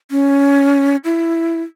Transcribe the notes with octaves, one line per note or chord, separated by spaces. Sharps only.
C#4
E4